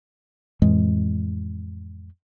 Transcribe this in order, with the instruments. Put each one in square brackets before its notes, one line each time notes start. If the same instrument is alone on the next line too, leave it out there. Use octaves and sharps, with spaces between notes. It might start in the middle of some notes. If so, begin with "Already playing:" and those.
[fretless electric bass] F2 A2 E3 G#3